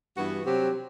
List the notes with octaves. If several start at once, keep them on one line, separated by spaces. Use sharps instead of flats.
G2 E3 B3 F#4
C3 F#3 C4 G4